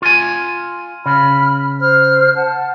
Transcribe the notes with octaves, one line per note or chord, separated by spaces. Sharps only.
F4 G#5
C#3 B5 F6
C5 F6
F#5 A5